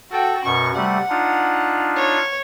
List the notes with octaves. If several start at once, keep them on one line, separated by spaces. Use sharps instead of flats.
F#4 A4 G5
F#2 B2 C#6
C3 G3 A3 F#5
D4 D#4 F4
C#5